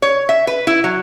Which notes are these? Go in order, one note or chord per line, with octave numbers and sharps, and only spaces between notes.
C#5
E5
B4
E4
F#3